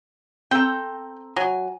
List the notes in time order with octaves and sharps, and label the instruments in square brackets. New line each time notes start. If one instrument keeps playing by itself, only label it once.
[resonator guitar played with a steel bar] C4 A4 A#5 [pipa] G5
[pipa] F#3 [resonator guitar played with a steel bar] G#5